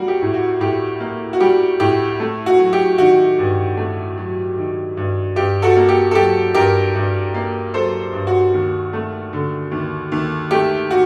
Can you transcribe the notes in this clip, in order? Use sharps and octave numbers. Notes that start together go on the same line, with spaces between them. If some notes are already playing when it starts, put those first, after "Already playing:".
Already playing: G3 A#3 F#4
G4
A2
F#4
A2 G4
A#3
F#4
G3 G4
A2 G4
A3
F#4
F#3
G4
D#3 F#4
G2
A3
F#3
D#3
G2
G2 G4
F#4 A4
A#3
G4
A4
F#3 G4
G2 G4 A#4
G2
A#3
F#3 A4 C5
G2
F#4
D#2
A3
D3
D#2
D#2
A3 G4
F#4